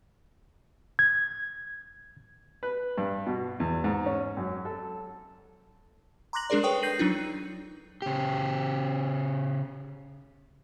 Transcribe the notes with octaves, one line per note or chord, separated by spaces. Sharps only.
G#6
B4
G2
B2
E2
G#2
C#4
F#2
A4
A#5 C6 D6 F#6 A#6 F#7
G#3 D4 G#4 A#4 D5
A4 B4 C#5 G5 C#6 D#6
G6 A#6 C7 D#7 F#7
F#3 D4 D#4 F4
C#3 G4